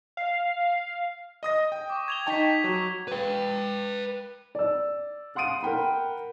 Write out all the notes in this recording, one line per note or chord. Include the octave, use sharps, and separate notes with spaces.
F5
D#5 D#6 A#6
G5
C#6 D6
G#6 F7 G7
D#4 G5 A5 C#6 G#6 B6
F#3
B4 G5
D5 E6
F5 F#5 C6 D#6 D7 D#7
A#4 F#5 G5 B5